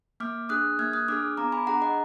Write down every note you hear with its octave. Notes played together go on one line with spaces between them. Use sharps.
A#3 D6 F6
D4 G#4 D#6 F#6
A#3 F6 G#6
D#6 F#6
D4 G#4 D6 F6
B3 A#5 D6
G#5 B5
D4 G#4 F#5 A#5
D#5 F#5